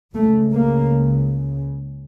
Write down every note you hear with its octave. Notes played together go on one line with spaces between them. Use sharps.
C#2 C#3 A3
A#3